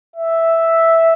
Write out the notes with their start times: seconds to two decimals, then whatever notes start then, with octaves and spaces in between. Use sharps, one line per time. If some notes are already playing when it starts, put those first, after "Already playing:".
0.16 E5